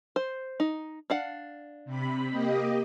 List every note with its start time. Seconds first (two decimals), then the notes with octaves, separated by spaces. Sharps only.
0.16 C5
0.60 D#4
1.10 D4 F5 F#5
1.85 C3 B5
2.30 A#3 G4 D#5